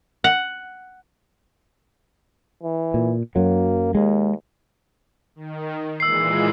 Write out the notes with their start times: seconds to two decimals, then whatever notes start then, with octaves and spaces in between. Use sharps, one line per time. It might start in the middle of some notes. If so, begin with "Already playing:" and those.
0.24 F#5
2.63 E3
2.94 A#2
3.36 F#2 F#3 A#3
3.95 D#2 G#3
5.36 D#3
6.00 A#2 E3 G#3 E6 C7